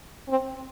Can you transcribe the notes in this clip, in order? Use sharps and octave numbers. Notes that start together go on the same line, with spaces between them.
C4